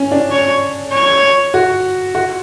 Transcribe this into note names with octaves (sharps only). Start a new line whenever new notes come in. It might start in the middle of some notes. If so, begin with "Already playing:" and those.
Already playing: C#4
D4
C#5
C#5
F#4
F#4